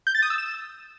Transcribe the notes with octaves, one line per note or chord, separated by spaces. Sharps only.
G6
A6
D#6
E6
E7